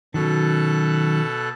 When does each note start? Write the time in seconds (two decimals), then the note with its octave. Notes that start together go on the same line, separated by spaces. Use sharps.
0.14 B2 D#3 F#3 C#4 A4 F#6